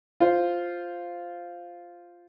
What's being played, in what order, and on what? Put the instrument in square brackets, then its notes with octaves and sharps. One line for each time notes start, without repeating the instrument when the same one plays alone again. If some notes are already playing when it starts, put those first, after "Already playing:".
[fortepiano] F4 C5